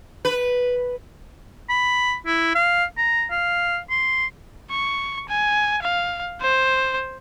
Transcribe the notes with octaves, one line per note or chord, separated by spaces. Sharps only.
B4
B5
E4
F5
A#5
F5
C6
C#6
G#5
F5
C5